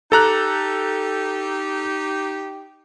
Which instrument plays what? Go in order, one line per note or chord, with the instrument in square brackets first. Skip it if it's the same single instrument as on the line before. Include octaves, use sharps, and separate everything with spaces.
[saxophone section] D#4 G4 [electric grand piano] A4 A#5 F#6